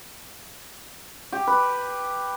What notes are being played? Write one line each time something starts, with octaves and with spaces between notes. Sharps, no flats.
G4
B4